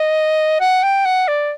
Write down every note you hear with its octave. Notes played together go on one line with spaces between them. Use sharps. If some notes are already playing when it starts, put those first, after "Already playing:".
Already playing: D#5
F#5
G5
F#5
D5